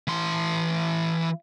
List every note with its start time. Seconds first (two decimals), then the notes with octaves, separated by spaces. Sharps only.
0.08 E3 C6